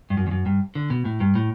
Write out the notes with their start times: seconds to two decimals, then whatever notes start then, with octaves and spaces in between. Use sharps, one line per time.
0.10 G2
0.17 F#2
0.27 E2
0.31 F#2
0.46 G2
0.75 D3
0.90 B2
1.05 A2
1.20 G2
1.35 A2